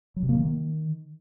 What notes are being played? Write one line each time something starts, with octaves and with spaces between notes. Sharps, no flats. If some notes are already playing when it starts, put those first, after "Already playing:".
F#3
C3
A#3
D#3